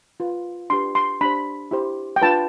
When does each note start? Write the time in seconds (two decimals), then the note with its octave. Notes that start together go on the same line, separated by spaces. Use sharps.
0.20 F4 B4
0.70 D4 G4 B4 C6
0.95 C6
1.21 D4 G4 C5 B5
1.71 E4 G4 C5
2.16 G5
2.22 D4 F4 B4 A5